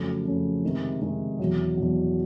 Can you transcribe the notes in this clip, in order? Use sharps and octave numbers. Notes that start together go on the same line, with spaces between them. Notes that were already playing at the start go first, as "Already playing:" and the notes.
Already playing: F2 C#3 F#3 A3
F2 C#3 F#3 A3
C3 D#3 G#3
C3 D#3 G#3
E2 B2 F#3
E2 B2 F#3